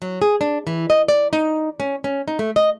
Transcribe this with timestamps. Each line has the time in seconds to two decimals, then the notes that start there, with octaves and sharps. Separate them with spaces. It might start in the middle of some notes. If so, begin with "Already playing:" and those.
0.02 F#3
0.22 G#4
0.41 D4
0.67 E3
0.90 D#5
1.08 D5
1.33 D#4
1.80 C#4
2.04 C#4
2.28 D#4
2.39 A3
2.56 D#5